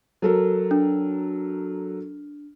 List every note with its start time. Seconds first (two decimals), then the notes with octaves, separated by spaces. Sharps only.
0.22 F#3 A4 A#4
0.71 D4